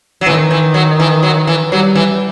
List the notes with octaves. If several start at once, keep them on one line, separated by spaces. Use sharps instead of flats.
F#3
D#3 E3
E3
F#3
E3
F#3
E3
F#3 G3
E3